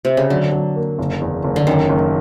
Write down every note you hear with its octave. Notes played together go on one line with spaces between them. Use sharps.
C3
C#3
D3 F#3
F#3
A#3
F#1
E2
F#1
D3
F#2 D#3
F#1